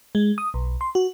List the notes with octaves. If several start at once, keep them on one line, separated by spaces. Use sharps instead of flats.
G#3
D#6
B1
C6
F#4